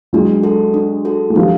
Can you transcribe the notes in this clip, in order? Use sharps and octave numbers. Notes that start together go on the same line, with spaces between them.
F#3 G#3 D4
F#4 A4
D4
F#4 A4
G#3
F3 G3 D4